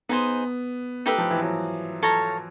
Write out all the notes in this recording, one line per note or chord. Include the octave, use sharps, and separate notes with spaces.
B3 D#4 G#4 C5
A3 D#4 G4 B4 E5
F3
E3
F#3
A4 C#5 F5 A#5